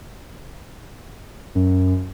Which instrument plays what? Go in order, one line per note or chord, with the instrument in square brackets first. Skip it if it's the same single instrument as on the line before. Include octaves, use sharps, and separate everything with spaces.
[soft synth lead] F#2